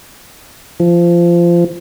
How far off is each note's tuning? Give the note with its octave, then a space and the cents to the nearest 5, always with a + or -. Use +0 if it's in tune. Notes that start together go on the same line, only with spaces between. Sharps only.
F3 -20